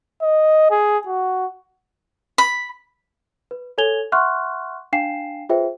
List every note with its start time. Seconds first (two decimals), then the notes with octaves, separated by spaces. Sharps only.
0.22 D#5
0.71 G#4
1.07 F#4
2.38 B5
3.51 B4
3.78 A4 C#5 G#5 G#6 F7 G7
4.12 E5 F#5 C6 C#6 F6 F#6
4.93 D4 F5 G5 G#5 C7 E7
5.49 F4 G#4 B4 C5 E5 G5